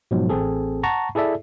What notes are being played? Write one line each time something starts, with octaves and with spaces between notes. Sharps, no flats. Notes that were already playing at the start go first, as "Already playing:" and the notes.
G#2 B2 F3 F#3
A1 C4 G#4 A4
F#5 A5 A#5 C#6
E4 G#4 A4 D5 E5